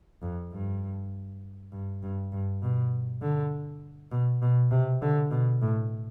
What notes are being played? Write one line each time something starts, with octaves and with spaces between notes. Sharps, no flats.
F2
G2
G2
G2
G2
B2
D3
B2
B2
C3
D3
B2
A2